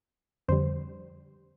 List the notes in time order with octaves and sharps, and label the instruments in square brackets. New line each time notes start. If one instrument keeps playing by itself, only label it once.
[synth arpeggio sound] F2 D3 G3 C5